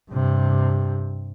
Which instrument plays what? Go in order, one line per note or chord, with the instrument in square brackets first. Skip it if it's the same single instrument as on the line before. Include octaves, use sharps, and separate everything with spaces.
[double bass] G2 C3